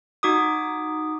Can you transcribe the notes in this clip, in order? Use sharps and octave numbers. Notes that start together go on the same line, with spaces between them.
D#4 F#4 D6 D#6